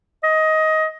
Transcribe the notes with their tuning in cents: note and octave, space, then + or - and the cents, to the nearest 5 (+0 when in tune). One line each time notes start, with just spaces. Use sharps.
D#5 +15